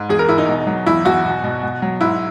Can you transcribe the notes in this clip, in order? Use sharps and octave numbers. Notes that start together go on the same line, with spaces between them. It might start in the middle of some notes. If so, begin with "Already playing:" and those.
Already playing: G#2
E2 G#4
A#4
E2 E4
D#4
B2
F#3
E2 E4
E2 F#4
B2
B2
B2
F#3
G#2 E4